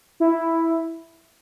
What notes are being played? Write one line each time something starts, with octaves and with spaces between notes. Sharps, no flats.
E4